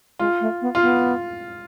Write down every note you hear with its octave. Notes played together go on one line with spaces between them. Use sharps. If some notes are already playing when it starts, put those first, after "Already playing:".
G#3 F4
A3
B3
F4
B3